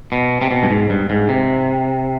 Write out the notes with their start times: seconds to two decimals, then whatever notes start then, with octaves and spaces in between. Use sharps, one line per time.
0.12 B2
0.42 C3
0.51 B2
0.63 G2
0.70 G#2
0.90 G2
1.10 G#2
1.29 C3